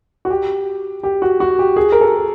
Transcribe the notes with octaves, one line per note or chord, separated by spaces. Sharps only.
F#4
G4
G4
F#4
F#4
G4
G#4
A#4
A4